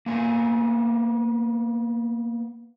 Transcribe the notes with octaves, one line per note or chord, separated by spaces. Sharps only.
A#3 B3 G#5